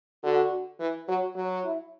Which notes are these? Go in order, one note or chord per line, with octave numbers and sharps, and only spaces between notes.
D3 F#4
E3
F#3 F#4
F#3
E4